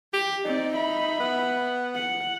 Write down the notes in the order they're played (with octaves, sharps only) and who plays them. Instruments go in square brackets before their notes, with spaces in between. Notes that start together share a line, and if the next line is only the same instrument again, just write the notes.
[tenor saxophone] G4 [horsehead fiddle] G5
[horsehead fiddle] C4 D5 [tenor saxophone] D#4
[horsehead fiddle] E5 B5
[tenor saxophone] B3
[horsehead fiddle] F#5